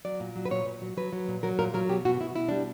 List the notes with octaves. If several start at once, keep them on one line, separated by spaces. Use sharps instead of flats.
F#3 D5
A#2
F#3
B4
A#2 C#5
A#2
F#3
F#3 B4
F#3
A#2
F#3 A#4
A#2 A#4
F#3 A#4
B2 G4
B2 F#4
B2 E4
B2 E4
G3 D4